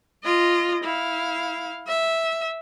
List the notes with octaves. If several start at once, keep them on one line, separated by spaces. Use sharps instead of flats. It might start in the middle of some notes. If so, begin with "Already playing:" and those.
F4 D#5
E4 F5
E5